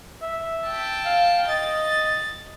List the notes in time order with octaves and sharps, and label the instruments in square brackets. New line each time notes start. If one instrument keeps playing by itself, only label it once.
[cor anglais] E5
[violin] G5 A5
[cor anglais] F5
[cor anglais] D#5 [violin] A6